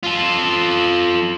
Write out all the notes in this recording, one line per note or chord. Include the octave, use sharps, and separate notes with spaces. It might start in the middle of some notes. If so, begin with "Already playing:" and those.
F4 A4